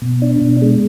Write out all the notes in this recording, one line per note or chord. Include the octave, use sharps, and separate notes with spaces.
B2
D4
B2
G#3